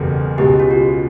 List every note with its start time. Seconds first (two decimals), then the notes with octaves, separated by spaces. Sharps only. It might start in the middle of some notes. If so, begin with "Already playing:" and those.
Already playing: F#1 E2 B2 G3 A4
0.38 C#2 B2 G#3 G4
0.49 G4
0.60 F4
0.71 F#4